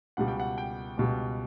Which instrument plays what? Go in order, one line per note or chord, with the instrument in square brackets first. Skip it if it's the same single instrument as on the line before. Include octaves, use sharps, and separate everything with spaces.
[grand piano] C#2 B2 G3 F#5
G5
F#5
G5
C#2 B2 G3